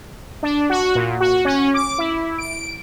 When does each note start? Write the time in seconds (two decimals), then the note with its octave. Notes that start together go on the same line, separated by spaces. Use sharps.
0.43 D4
0.70 F#4
0.95 A#2
1.20 F#4
1.45 C#4
1.74 D6
1.98 E4
2.38 D7